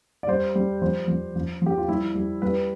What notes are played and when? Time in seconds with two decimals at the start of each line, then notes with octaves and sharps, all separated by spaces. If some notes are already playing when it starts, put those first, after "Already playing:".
0.23 D5
0.28 G3 C5
0.55 G3
0.82 F3 C5
1.08 F3
1.36 F3
1.62 F3 G4
1.78 F4
1.88 G3 E4
2.15 G3
2.42 G3 B4